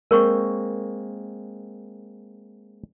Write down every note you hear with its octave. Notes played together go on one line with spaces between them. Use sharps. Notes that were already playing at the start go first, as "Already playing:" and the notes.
G#3 A#3 C4 A#4 C#5 C#6